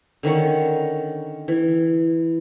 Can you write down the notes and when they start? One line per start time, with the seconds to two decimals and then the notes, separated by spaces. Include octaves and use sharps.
0.23 D3 D#3 C#4 C#6
1.48 E3